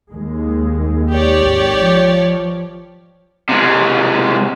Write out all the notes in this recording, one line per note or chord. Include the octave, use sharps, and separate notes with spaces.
D#2 G#3
G4 C#5 D5
G#1
F3
C3 G#3